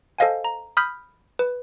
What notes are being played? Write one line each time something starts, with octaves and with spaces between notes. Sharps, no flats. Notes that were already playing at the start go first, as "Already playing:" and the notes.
A4 C5 D#5 F5 F#5 G#5
A#5
B5 D#6 F6 G6 B6
B4